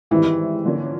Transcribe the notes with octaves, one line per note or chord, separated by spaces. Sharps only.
G#2 D#3 E3 G3 C4 E4
D3 F3 A#3 C#4